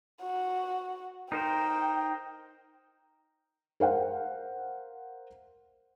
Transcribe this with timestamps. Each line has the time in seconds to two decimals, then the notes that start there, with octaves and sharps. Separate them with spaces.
0.22 F#4
1.32 D#4 A#4 C5 G5
3.80 A#4 C5 F5 F#5